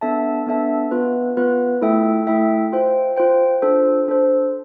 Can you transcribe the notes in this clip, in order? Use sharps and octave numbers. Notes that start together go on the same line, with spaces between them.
B3 D4 A4 E5 A5
B3 D4 A4 E5 A5
B3 F4 B4
B3 F4 B4
A3 E4 A4 E5 G5
A3 E4 A4 E5 G5
F4 C5 G5
F4 C5 G5
D4 A4 C5
D4 A4 C5